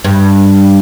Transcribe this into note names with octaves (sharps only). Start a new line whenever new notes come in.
G2